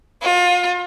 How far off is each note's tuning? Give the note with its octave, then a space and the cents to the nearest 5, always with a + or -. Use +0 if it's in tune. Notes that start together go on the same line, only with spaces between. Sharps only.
F4 +35